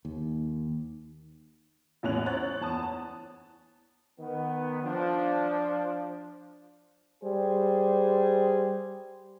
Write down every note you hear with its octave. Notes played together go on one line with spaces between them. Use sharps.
D#2
A1 E2 A2 C#4 F#6 F7
C5 C#5 F#6 A6
E2 A5 D#6
D#3 B3
F3 D4
G3 G#4 C5